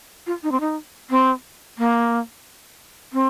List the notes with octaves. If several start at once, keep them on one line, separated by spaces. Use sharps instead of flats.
F4
D#4
C4
D#4
C4
A#3
C4